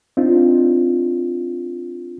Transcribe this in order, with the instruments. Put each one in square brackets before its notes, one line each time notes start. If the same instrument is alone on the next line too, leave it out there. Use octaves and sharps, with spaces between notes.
[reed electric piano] C4 D4 D#4 F4